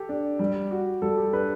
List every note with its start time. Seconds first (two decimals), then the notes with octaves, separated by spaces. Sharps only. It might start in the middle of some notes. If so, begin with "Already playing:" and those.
Already playing: G4 A4
0.09 D4
0.39 G3
0.71 F#4
1.02 G3 A4
1.17 G4
1.33 D4 B4